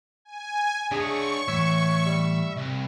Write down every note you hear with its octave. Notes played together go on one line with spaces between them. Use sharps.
G#5
D4 G#4 C#5 D#5 E5 F#5 C#6
A2 E3 C#5 E5
G3
C2